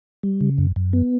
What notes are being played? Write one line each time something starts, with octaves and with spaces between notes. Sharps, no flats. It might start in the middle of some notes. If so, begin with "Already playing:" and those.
G3
C#3
F#2
F#2
B3